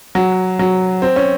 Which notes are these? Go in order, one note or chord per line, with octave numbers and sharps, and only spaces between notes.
F#3
F#3
C4
C#4